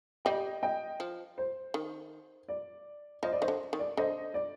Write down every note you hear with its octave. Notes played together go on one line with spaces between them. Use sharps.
G3 D#5 G5
D#5 G5
F3
C5
D#3
D5
F3 C5 D#5
D5
D#3 C5 D#5
D3
D#3
D5
D3 C5 D#5
D5